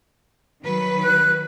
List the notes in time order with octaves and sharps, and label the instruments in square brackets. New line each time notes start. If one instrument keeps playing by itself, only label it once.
[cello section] D#3 F#3 B4
[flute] F#6